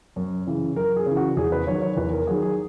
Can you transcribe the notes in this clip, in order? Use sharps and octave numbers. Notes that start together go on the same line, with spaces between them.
F#2
C#3 E3
F#2 A#4
G#4
C#3
E3
F#4
E2 G#4
B4
D#3 F#3 C#5
C#5
E2 B4
A#4
D#3 F#3 G#4
G#4